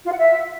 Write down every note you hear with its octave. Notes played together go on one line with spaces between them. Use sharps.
F4
F#5
E5